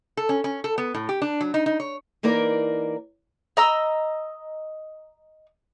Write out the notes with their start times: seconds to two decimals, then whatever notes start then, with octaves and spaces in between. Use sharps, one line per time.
0.17 A4
0.29 C#4
0.44 C#4
0.64 A4
0.78 B3
0.94 A2
1.09 G4
1.22 D4
1.41 F#3
1.54 D#4
1.66 D#4
1.80 C#5
2.23 E3 A#3 D#4 A#4 D5
3.57 D#5 A#5 E6